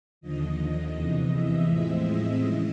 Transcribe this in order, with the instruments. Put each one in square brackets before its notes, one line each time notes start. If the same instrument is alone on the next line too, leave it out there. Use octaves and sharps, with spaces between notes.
[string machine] D#2 D3 F3 D#5
E2 C3 E3
E5
A2 F3 G#3 C4 E5
D#5
C#3 E3